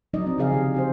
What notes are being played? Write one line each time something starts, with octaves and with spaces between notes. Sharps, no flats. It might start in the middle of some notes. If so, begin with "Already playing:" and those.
F3 F#3 D4 D#4 D5 D#5
C4
C#3 F3 G#4 D#5 F5
C3 D#3 G4
C4 G4 C5